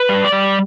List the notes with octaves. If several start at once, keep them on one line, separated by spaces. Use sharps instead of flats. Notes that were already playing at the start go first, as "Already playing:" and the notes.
Already playing: B4
G3
D5
G3